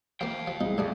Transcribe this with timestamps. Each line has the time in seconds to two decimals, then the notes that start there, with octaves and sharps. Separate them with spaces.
0.21 F3 A#3 F5 G5
0.47 F3
0.61 C2 G#3 D#4
0.78 F2 A2 D4 G#4